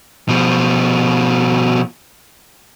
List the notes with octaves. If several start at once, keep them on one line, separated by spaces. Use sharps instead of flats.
B2 F3